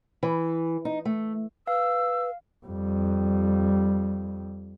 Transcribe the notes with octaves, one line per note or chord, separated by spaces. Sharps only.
E3
D#4
A3
B4 F5 E6
F2 G3